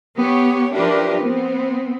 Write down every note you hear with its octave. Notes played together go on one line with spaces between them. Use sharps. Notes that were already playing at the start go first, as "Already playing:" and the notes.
B3 G4 C#5
F3 D4 E4 G4 A#4 B4
B3 C4